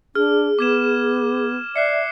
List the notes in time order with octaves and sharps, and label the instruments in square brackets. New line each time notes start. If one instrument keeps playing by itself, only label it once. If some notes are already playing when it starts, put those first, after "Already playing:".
[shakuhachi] D4 [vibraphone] G#4 [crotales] F6
[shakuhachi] B3 [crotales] D6 G#6 E7
[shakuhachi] D5 [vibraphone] E5 [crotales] F#6 C7 C#7